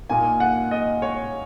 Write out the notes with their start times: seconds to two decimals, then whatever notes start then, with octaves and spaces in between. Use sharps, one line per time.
0.09 A#2 A#3 D#4 G#5
0.40 F#5
0.71 D#5
1.02 C#5